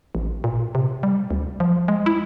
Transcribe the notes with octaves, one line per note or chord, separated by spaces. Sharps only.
A1
A#2
C3
G3
D2
F3
G#3
E4